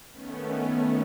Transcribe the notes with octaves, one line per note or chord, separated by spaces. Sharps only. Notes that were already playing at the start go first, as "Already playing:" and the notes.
D#3 A3 B3 C#4